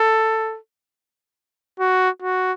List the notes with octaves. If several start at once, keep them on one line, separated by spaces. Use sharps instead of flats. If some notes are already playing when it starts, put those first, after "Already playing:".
Already playing: A4
F#4
F#4